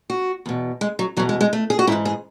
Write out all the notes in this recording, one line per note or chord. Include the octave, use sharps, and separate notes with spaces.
F#4
E2 B2
G#3
F#3
E2 B2 F#3
G#3
G#3
A3
G#4
F#4
G#2 E3 E4
G#4